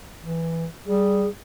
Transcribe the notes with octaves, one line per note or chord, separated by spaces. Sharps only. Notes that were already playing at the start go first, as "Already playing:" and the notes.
E3
G3 G#4